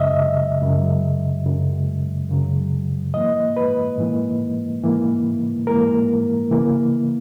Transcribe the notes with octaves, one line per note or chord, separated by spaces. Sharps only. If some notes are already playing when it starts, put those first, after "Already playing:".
Already playing: F#2 C#3 F#3 D#5 E5
F#2 C#3 F#3
F#2 C#3 F#3
F#2 C#3 F#3
G#2 E3 A#3 D#5
B4
G#2 E3 A#3
G#2 E3 A#3
G#2 E3 A#3 A#4
C#3 E3 A#3